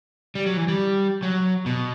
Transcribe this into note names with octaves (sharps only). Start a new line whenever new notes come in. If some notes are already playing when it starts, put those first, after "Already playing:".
G3
F#3
E3
G3
F#3
B2